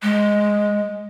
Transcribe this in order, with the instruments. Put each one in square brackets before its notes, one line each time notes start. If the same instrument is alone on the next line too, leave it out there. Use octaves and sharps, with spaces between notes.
[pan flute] G#3